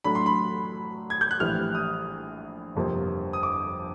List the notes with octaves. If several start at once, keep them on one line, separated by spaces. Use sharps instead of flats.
A2 F#3 A3 D4 B5
C6
B5
G#6
G6
F#6
A#1 A2 E3 G3 F6
D#6
G1 F2 C3 F3 A#3
D#6
D6